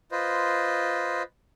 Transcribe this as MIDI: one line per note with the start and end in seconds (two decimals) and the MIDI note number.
0.12 1.23 65
0.12 1.23 71
0.12 1.23 72
0.12 1.23 75